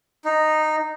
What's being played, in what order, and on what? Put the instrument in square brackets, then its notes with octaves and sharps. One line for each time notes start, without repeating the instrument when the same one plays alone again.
[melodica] D#4